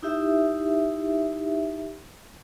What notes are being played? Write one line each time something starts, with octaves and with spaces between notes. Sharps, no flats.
D#4 E4 G4 E5